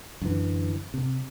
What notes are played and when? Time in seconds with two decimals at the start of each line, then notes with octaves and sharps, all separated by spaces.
0.22 F#2 D3 E3
0.94 C3